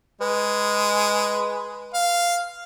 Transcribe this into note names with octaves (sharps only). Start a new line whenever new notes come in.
G#3 B4
F5